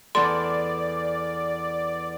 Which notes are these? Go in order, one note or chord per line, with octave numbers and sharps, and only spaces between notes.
E2 A4 D5 C6